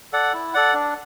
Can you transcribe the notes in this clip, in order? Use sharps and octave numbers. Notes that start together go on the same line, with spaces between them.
A4 D5 F#5
E4
A4 D5 F#5
D4